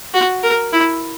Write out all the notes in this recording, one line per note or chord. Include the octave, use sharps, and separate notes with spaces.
F#4
A#4
E4